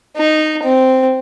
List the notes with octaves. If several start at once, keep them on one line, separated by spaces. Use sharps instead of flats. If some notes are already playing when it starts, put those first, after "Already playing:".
D#4
C4